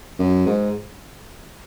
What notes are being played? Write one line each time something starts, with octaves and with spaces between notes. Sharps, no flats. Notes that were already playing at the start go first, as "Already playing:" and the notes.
F#2
G#2